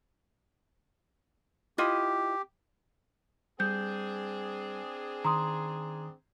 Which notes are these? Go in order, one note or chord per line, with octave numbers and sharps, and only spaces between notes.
E4 F4 G4 D#5
G3 C4 D4 G#4 G6
D#3 A#5 C6 D#6